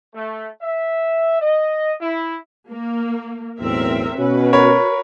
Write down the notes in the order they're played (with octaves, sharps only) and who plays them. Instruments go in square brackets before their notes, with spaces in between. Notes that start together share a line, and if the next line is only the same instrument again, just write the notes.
[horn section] A3
E5
D#5
E4
[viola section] A#3
[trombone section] B1 E2 A2 [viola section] C4 A#4 E5
[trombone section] B2 C#4 [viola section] F#4 B4
[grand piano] A#4 C#5 B5